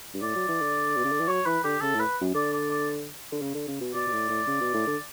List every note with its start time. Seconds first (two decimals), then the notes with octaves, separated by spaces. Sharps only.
0.14 G2
0.22 A2 D5
0.35 F#3
0.49 E3
0.61 D3
0.97 B2
1.04 C#3
1.12 D3
1.20 E3
1.28 F#3 C#5
1.46 E3 B4
1.64 D3 G4
1.81 C#3 A4
1.94 A2
1.99 B4
2.21 F#2
2.35 D3 D5
2.53 D5
2.70 D5
3.32 D3
3.42 C#3
3.55 D3
3.68 C#3
3.81 B2
3.94 B2 D5
4.07 B2
4.13 A2
4.30 A2
4.47 C#3
4.61 B2
4.74 A2
4.87 D3